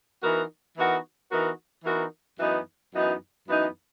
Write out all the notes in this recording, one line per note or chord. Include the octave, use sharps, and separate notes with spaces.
E3 B3 D#4 F#4 A#4
E3 B3 D#4 F#4 A#4
E3 B3 D#4 F#4 A#4
E3 B3 D#4 F#4 A#4
F#2 E3 B3 D#4
F#2 E3 B3 D#4
F#2 E3 B3 D#4